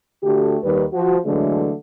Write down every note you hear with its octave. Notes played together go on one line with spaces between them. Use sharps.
D3 A3 F#4 G4
D#2 D#3 G3 B4
F3 F#4
D3 E3 F#3 G#3 A3